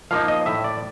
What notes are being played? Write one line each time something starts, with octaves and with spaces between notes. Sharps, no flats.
F3 A#3 D#4 F5
D#5
A2 E5
D5